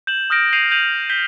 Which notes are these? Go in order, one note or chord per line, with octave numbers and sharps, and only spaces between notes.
G6 E7 F#7
D#6 F6 G6 A#6 D7
G6 C7 D#7 F7 F#7
G6 D#7 F7 F#7
G6 B6 D#7 G7